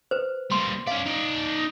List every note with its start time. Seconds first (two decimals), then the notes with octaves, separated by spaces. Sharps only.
0.11 B4 C5
0.52 G3 A#3 C6
0.87 C#4 D5 F5
1.06 D#4 D5